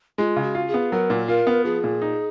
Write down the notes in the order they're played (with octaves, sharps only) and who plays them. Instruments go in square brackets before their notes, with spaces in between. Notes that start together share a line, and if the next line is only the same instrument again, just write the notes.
[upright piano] G#3 [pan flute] F4
[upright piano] C#3
[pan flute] F#4
[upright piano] F4
[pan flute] G#4
[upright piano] B3
[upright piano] F#3 [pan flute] A#4
[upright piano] A#2
[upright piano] F4 [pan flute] A#4
[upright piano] B3
[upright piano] F3 [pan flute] G#4
[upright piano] A#2
D#4